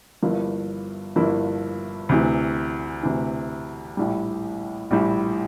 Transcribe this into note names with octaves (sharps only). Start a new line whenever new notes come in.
G1 G2 F3 A#3 E4
G1 G2 F3 A#3 E4
D2 C3 E3
D2 C3 E3
A#1 A2 G3
A#1 A2 G3